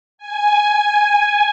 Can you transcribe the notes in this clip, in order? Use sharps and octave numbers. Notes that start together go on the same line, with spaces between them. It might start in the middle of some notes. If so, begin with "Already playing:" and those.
G#5